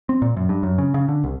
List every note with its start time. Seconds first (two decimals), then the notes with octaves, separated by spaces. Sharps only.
0.09 C4
0.22 A#2
0.37 F#2
0.49 G2
0.63 F#2
0.78 C#3
0.94 C#3
1.08 D3
1.24 C2